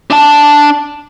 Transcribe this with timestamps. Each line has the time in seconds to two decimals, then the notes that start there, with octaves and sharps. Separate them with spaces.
0.10 D4 A5